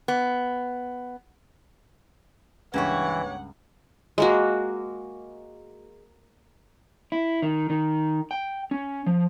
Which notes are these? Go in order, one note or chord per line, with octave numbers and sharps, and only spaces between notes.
B3
C#2 G2 E3 A#3 G4 C#5 F#5
G#3 A#3 F#4
E4
D#3
D#3
G5
C#4
F3